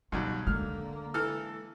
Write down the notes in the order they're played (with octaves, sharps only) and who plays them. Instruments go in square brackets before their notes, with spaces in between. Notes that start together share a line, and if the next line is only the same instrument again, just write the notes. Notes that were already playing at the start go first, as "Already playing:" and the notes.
[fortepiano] D#2 F#3 G3 [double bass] B2 [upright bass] D#3
[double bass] D3 A#3 [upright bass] G#3 [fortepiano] F6
[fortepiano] E3 A4 F6